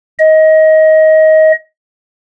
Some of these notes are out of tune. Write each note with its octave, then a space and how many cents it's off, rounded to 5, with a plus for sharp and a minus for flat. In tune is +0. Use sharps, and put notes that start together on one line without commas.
D#5 +20